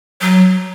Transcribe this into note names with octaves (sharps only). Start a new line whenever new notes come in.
F#3